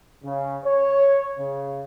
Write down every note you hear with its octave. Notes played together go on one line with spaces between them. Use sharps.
C#3
C#5
C#3